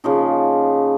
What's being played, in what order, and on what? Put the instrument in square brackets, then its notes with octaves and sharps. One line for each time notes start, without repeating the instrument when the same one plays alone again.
[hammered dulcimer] C#3 F3 A#3 D#4